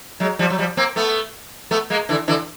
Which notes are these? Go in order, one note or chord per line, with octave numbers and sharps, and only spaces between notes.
F#3 G#3
F3 G3
F#3
F3 G3
A#3 C4
A3 B3
A3 B3
G#3 A#3
D3 E3
D3 E3